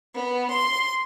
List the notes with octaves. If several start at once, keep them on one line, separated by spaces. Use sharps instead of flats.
B3
C6